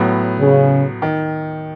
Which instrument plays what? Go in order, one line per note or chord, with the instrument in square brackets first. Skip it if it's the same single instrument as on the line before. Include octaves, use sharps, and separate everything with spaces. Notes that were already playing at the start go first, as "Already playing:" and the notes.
Already playing: [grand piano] A2 F#3 B3
[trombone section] C#3
[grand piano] D#3